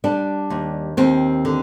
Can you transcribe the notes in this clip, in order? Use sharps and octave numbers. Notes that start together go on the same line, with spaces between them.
G3 D4
D#2
D#2 C4
D3